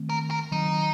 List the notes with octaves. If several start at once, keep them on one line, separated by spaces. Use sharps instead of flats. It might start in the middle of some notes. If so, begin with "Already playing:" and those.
Already playing: D#3 A3 C4
A#4
A#4
D#3 F#3 C4 D#4